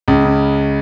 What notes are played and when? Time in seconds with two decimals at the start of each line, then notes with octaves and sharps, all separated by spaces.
0.08 C#2
0.24 C#3